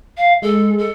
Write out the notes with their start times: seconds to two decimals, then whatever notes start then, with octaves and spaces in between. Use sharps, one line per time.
0.17 F5
0.42 G#3 A4
0.78 A4